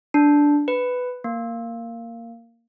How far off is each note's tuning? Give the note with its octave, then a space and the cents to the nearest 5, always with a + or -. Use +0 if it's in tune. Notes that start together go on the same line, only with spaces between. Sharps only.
D4 -5
B4 +10
A#3 -10